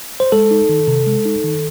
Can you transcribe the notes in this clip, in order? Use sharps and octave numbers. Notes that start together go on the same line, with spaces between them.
C5
G#3 A4
D#4
D#3
C3
G#3
D#4
D#3